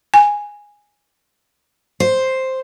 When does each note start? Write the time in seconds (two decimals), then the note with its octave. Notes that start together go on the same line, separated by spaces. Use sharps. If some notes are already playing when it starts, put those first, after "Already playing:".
0.14 G#5
2.00 C5